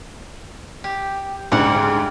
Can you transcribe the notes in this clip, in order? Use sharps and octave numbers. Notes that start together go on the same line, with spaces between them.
G4
D2 G#2 C#3 G3 F#5